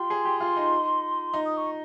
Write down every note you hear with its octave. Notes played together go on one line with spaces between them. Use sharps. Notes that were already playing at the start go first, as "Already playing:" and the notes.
Already playing: F4 G4 C6
G#4
G4
F4
D#4
D#4
D#6
C#6